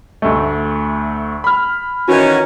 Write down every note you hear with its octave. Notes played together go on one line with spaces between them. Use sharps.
D2 A3
B5 F6
D#3 E3 C#4 F#4